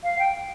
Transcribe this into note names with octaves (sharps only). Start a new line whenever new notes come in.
F5
G5